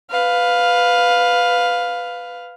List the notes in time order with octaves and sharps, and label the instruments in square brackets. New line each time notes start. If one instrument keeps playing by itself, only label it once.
[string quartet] B4 F5